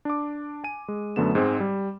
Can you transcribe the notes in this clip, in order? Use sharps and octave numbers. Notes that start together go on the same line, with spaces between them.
D4 D6
G#5 D#7
G#3
F#2 D3 A3 B3 E7
G#2 G#3 C4
G3